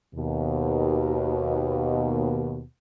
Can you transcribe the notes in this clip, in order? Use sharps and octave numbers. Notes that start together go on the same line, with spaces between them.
D#2 B2